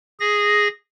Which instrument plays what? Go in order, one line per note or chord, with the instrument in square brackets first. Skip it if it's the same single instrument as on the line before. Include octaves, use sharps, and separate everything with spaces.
[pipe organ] G#4 A#6